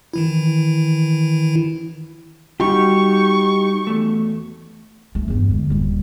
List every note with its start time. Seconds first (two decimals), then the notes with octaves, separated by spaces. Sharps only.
0.13 D#3 E3 E4
2.60 G3 D#4 F#4 G4 C#6
3.87 E2 A3
5.15 A3
5.28 E2 G2
5.50 D3 G#3
5.70 D#1 G3